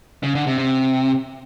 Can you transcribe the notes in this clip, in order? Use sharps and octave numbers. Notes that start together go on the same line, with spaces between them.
C#3
D3
C3
C3